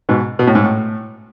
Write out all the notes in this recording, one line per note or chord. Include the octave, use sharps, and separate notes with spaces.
G#2 B2
B2
A2
G#2
A2